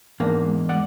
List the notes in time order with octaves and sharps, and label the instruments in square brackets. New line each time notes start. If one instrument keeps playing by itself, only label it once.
[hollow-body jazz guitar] E2 A#3 [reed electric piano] G#2 D4
[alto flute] G#3
[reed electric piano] D5 F#5 D6